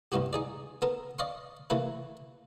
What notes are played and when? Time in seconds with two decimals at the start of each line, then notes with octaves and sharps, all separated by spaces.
0.12 C2 G2 B3 F#4 G4
0.33 D#4 G#4 D5
0.82 B3 A4 A#4
1.19 D5 D#5 F5 C6 C#6
1.70 C3 E3 A3 A#3 B4